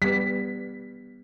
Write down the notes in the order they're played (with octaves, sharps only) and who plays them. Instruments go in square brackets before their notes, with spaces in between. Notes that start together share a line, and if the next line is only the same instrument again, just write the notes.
[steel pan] G3 B3 [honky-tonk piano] B6